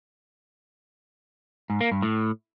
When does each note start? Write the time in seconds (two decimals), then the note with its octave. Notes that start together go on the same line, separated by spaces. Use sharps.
1.70 G#2
1.81 A#3
1.92 G2
2.02 A2